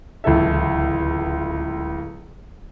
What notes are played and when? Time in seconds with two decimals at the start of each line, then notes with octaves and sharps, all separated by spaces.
0.24 D1 C#2 E3 A4 E5